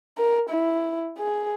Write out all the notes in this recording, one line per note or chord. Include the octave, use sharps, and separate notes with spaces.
A#4
E4
G#4